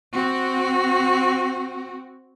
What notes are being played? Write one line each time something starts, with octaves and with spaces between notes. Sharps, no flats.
C4 F#4